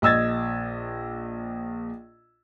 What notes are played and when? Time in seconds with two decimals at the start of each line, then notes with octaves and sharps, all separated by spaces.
0.02 A#1 D#5 E6 G#6 A6